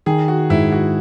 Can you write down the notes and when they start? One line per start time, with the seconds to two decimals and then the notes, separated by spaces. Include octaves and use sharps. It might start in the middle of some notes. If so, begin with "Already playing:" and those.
0.06 D#3 G#4
0.28 F#4
0.50 G#2 E4
0.72 F#4